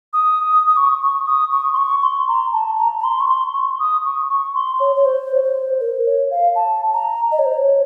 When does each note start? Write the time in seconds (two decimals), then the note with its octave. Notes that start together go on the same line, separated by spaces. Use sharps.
0.13 D#6
0.52 D#6
0.66 D#6
0.77 C#6
1.02 C#6
1.27 D#6
1.52 C#6
1.73 C6
1.77 C#6
2.02 C6
2.28 A#5
2.53 A5
2.78 A#5
2.99 A#5
3.04 C6
3.20 C#6
3.29 C6
3.53 C#6
3.79 D#6
4.05 C#6
4.30 C#6
4.55 C6
4.80 C#5
4.96 C#5
5.05 C5
5.35 C#5
5.43 C5
5.81 A#4
6.06 C#5
6.31 F5
6.55 A5
6.94 A#5
7.32 D#5
7.39 C#5
7.46 C5
7.54 C#5